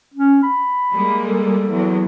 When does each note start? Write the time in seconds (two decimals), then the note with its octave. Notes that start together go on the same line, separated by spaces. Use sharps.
0.14 C#4
0.43 B5
0.93 G3 G#3 A#3
1.27 A4
1.70 E2 F#3